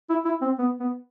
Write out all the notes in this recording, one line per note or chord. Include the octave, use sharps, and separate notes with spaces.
E4
E4
C4
B3
B3